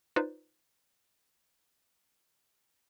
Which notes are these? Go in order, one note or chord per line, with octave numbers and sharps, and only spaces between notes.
D#4 F4 B4 C5 D5